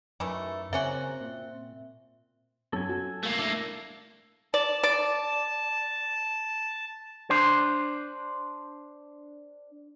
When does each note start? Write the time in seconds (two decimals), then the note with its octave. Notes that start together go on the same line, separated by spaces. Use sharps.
0.20 F#2 D#3 E3 A3
0.73 C#3 A#3 C4 C#4 F#4 E5
1.21 A#2
2.73 F#2 A4 G#5
2.89 F#4
3.23 A3 A#3
3.39 D4 E4
4.54 D5 A5
4.83 D5
7.30 D4 C5